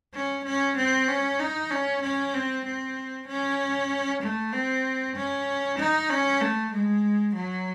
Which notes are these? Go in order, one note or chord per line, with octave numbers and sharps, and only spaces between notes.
C#4
C#4
C4
C#4
D#4
C#4
C#4
C4
C4
C#4
A3
C4
C#4
D#4
C#4
A3
G#3
F#3